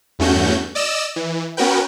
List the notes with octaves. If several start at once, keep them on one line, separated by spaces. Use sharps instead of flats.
E2 G2 A3 C#4 F#4 G6
D5 D#5 E6 E7
E3
B3 C#4 F#4 A#4 B4 G5